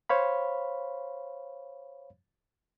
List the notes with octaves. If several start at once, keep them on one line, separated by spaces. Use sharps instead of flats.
C5 C#5 F5 B5